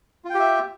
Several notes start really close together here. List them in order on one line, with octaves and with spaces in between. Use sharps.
F4 G5 G4 E5